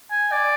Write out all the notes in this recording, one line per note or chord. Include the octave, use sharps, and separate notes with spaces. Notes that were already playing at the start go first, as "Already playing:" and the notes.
G#5
D5